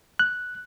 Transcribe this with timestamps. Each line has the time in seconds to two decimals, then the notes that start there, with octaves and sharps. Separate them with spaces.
0.19 F#6